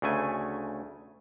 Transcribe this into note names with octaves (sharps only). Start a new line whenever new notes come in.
D2 C#3 A3 G#5